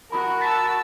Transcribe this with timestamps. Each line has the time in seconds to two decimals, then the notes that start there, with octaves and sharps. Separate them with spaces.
0.11 F#4 A#4 A5 B5 D#6
0.41 A5 E6 A6 B6